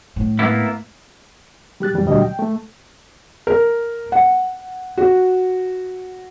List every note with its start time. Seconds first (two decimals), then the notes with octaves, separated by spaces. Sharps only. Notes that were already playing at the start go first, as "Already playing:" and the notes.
0.16 A2
0.39 A#3 B3 E4
1.80 G3 G4 F#6 A6
1.94 F#2 E3 G3
2.06 D2 A#2 F#3 G3 F#4 D#5
2.22 G5
2.39 A3
3.47 A#4
4.12 F#5
4.98 F#4